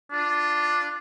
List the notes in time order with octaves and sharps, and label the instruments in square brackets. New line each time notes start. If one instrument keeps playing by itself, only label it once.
[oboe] D4 [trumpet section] F4